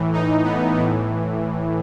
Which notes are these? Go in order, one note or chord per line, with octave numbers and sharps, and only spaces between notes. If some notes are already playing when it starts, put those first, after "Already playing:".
Already playing: A2 E3
D#4
B3
A2 E3